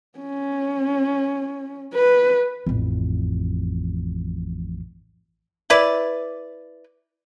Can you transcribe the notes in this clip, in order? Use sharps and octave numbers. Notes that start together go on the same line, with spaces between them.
C#4
B4
A1 F2
E4 B4 D5